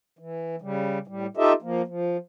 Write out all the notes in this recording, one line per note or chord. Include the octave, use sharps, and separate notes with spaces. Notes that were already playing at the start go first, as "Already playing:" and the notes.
E3
C#3 G3
A2 G3
D#4 F4 G4 A4 D#5 E5
F3 A#3
F3